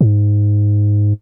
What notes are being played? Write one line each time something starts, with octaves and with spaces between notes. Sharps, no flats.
G#2